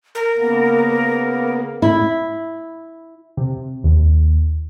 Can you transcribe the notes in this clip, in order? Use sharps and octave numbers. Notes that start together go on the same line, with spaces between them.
A#4
C#3 A#3 B3
E4
C3
D#2